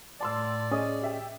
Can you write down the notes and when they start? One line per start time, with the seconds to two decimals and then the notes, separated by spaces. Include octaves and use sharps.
0.21 A2 D5 A5 C6 E6
0.72 C#4 G#4 D#5 D#6
1.01 G4 E5 G5